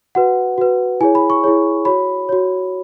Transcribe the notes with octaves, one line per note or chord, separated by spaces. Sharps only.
F#4 B4 F#5
F#4 B4
E4 G#4 C#5 G#5
B5
C#6
E4 G#4 C#5
F#4 C#5 B5
F#4 C#5